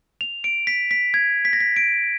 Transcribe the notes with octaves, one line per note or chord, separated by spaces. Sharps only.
F7
D7
B6
B6
G#6
B6
A#6
B6
D7